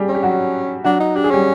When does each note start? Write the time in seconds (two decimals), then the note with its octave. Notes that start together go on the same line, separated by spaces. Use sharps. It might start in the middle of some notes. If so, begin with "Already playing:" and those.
Already playing: G3 G4 G#4
0.09 C#4
0.15 G4
0.23 F#3 F#4
0.84 F#3 D4 F#4
1.00 D#4
1.15 D4 G4
1.24 G#4
1.31 G3 C#4 G4